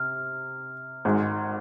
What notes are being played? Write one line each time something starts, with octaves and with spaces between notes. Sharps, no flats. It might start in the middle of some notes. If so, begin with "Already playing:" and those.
Already playing: C3 F6
G#1 G#2 G#3